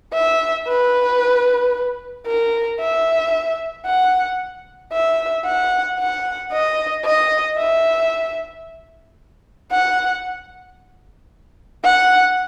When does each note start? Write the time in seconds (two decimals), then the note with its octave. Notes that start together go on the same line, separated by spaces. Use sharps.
0.14 E5
0.67 B4
2.27 A#4
2.80 E5
3.87 F#5
4.93 E5
5.46 F#5
5.99 F#5
6.53 D#5
7.05 D#5
7.58 E5
9.72 F#5
11.84 F#5